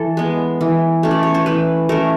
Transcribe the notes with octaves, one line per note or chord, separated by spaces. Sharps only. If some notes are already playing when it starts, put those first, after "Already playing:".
Already playing: E3 A4
G#3 B3
E3
A3 C#4
D5
C#5
C5
E3 B4
A3 C#4 A#4